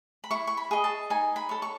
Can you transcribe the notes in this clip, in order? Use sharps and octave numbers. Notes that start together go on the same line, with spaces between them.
B5
E4 C#6
C#6
B5
G#4 D#5
A5
D#4 G#5
B5
A4 C#5
C#6